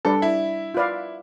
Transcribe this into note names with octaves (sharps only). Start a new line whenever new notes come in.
G3 D4 G4 A4 B4 D5
E4
F4 B4 D5 F5